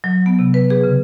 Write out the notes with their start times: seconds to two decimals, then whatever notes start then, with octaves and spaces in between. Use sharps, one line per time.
0.04 F#3
0.26 B3
0.39 C3
0.54 B4
0.70 G#4
0.83 C#3